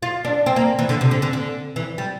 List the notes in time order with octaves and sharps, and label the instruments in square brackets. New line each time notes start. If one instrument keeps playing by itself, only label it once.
[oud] F4
D4
C4
A#3
E3
D3
C3
D3
D3
D3
E3
G3